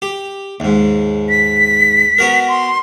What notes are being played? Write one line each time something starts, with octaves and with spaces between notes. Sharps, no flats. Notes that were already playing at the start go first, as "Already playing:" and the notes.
G4
D#2 G#2
B6
B3 F#4 A#4
C6